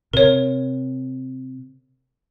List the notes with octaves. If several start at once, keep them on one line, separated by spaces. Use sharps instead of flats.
C3 A#4 C#5